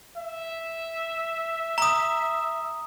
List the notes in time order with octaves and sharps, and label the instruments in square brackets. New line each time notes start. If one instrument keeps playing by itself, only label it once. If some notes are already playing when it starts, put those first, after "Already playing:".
[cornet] E5
[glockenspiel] A#5 D#6